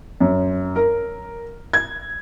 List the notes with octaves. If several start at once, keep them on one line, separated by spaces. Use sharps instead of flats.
F#2
A#4
G#6